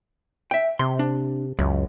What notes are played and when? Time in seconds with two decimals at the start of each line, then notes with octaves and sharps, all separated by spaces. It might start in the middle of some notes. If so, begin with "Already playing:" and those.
0.51 E5 G5
0.79 C3 C6
0.99 D4
1.59 C#2 F#2